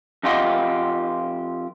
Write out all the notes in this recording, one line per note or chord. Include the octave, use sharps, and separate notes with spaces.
F2 D#4 F4 G4 D#5 F#5